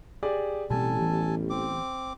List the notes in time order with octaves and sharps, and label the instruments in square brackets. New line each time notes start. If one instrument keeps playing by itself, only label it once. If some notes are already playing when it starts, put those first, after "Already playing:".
[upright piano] G4 G#4 D5
[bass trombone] A1 [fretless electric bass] B2 C4 [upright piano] G3 [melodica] A4 G#5 A5
[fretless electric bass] E3 B3
[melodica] C4 D6